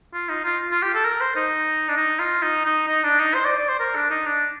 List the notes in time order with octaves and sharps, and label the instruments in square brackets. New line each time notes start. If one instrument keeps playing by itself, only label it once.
[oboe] F4
D#4
F4
F4
G4
A4
A#4
C5
D#4
D4
D#4
F4
D#4
D#4
D#4
D4
D#4
C5
D5
D5
C5
A#4
D4
D#4
D4